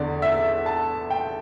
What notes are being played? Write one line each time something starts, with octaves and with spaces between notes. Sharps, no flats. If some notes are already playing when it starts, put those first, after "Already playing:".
Already playing: E2 D3 D5
E5
A5
G5